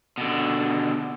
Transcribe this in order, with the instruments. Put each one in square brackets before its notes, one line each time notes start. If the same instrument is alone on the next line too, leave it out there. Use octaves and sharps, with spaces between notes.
[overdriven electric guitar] B2 D3